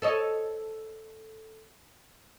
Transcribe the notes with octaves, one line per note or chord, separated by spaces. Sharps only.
A4 C#5 D#5